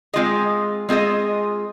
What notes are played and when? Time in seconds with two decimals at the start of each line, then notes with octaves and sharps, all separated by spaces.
0.14 G#3 C4 F4 G#4 D#5
0.89 G#3 C4 F4 G#4 D#5